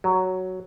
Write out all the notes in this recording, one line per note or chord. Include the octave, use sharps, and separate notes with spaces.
F#3